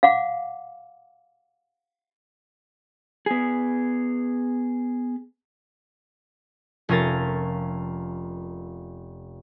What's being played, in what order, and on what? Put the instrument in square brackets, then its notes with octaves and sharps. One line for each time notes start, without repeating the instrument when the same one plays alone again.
[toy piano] F5 F#5 D6
[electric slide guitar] B3 G#4
[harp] F1 C#4 F4 A#4 A6